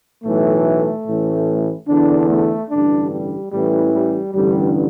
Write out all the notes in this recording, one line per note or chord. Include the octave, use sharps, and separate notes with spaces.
B1 A2 E3 A3
A1 A2 E3
E2 D3 D4
A3
A1 G2 D3 D4
G3
A1 A2 E3 G3
G3
A1 G2 D3 G3